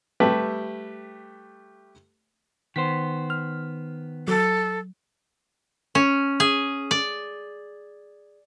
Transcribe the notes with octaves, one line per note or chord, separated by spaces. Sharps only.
G3 A3 G4 B4 E5
D#3 B3 C5 B6
F6
F#3 A4
C#4
G#4
D5